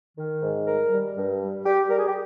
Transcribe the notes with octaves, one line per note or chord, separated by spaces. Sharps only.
D#3
G#2
G3 A#4
G3
G2
G3
G3 G4
G3 A#4
G#4
G4